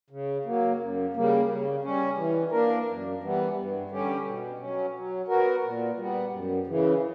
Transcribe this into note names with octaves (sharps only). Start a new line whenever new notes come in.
C#3
F#3 A#3
F#2
C#3 G3 A#3
C#3
G3 C#4
E3
A#3 D4 A#4
F#2
E3 G3 B3
G2
D3 G3 C#4 G4
B2
F#3 C#4
F#3
B3 F#4 A#4
A#2
G3 B3
F#2
C#3 E3